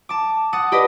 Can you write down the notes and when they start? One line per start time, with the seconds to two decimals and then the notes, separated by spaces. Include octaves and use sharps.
0.09 A5 D6
0.53 F#5 D#6 A6
0.72 G4 B4 D5 D#5